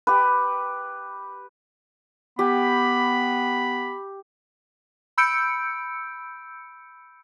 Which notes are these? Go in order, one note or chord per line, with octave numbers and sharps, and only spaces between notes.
G4 B4
B3 G4 B5
B5 E6 G6 C#7 D7